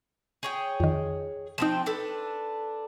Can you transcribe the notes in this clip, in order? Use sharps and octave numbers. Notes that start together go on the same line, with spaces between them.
G#4 C#5 G5
F2 D#3
F3 C4 D#4 G5 E7
D4 A4 B4